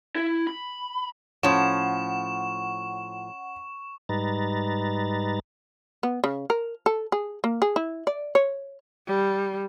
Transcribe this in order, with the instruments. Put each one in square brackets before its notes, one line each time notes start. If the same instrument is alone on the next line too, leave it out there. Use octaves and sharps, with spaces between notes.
[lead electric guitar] E4
B5
[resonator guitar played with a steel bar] A2 F3 [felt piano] C#4 [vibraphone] F#5 [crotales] C#6 E7
[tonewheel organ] G#2 G3 D#4 B4 A#5 A6
[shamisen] B3
C#3
A#4
A4
G#4
A#3
G#4
E4
D5
C#5
[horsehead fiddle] G3